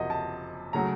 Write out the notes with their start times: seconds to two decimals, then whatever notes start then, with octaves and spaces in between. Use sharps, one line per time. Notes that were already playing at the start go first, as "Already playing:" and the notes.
Already playing: F#1 F2 C3 F#3 D#5 F#5
0.10 A5
0.73 C#3 F#3 A3 A#5